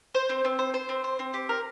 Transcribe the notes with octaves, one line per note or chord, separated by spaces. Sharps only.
C5
C4
C4
C5
C5
C4
C5
C4
G4
A#4